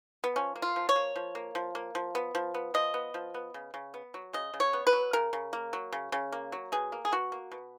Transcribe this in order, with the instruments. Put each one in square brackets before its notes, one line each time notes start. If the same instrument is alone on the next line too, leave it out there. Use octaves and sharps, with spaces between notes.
[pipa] B3
F3 C#4
A#3
F4
F3
C#5
A#3
F3
A#3
F3
A#3
F3
B3
F3
B3
F3 D#5
B3
F3
B3
C#3
C#3
B3
F#3
C#3 D#5
C#3
C#5
B3
B4
F#3
C#3 A#4
C#3
A#3
F#3
C#3
C#3
A#3
F#3
B2 G#4
A#3
G#4
B2 F#4
A#3
B2